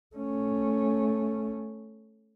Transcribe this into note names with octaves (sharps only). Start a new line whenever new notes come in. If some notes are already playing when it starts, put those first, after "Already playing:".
A3 C#4